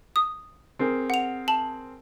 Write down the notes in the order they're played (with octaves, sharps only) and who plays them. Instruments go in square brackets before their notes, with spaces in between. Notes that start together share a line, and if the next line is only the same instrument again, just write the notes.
[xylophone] D#6
[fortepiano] C4 G#4 A#4
[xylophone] F#5 F7
A5 F#7